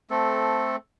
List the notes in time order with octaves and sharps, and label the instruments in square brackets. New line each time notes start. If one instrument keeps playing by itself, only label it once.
[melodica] A3 C4 A4